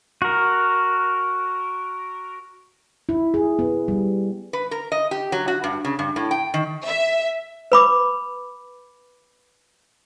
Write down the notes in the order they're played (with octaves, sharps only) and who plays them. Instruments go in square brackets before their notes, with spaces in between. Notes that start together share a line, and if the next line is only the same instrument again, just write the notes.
[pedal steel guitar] F#4 A#4
[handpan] E4
G#4
B3
G3
[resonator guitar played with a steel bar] B4
A#4
D#5
G4
F#3
F#4
G2
C#3
G2
A2
G5
D#3
[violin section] E5
[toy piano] B4 B5 D6